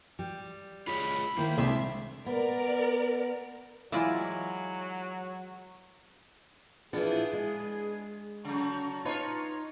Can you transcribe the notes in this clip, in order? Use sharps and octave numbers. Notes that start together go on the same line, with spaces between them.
G3
F4 G#4 C#5 B5
D#3 A#3 E4 C5
C2 G#3 D4 E5 C6
B3 A#4 D5
E3 F#3 G#3 E4 F4 D5
E3 F3 B3 D4 G#4
G#3
C#3 F#3 A5 A#5 C#6
D#4 F4 B4 C#5